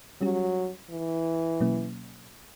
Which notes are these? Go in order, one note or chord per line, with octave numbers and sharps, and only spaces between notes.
F#3 G3 C#4 G4
E3
B2 F#3 A#3 C#4